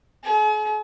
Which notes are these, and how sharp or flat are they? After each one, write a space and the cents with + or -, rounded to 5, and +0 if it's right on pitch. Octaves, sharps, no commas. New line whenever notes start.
G#4 +45